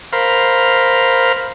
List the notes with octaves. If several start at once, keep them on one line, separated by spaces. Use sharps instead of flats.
A#4 C5 F5 B5